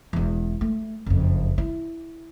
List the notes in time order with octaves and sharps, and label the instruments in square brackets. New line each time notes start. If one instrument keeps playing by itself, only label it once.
[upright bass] E1 E2
A3
F#1 F2
E4